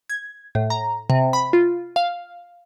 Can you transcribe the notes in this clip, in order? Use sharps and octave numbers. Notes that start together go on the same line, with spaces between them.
G#6
A2
A#5
C3
B5
F4
F5